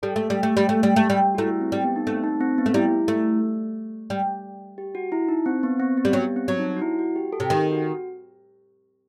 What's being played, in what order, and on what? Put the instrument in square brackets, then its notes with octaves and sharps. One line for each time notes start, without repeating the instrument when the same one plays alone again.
[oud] G3 [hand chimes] A4
[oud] A3
G3
A3
G3
A3
G3
A3
G3
[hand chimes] F#4
[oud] A3 [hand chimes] E4
[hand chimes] C4
[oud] G3
[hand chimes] B3
D#4
[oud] A3 [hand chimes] C4
[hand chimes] D#4
C4
B3
[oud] A3
[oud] G3 [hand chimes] E4
[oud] A3
G3
[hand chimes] G4
F#4
E4
D#4
C4
B3
C4
B3
[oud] G3
[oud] F#3 [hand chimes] B3
[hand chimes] C4
[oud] F#3
[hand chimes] D#4
F#4
E4
F#4
G4
A4
[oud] C3
[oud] D#3 [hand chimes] A4
[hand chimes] F#4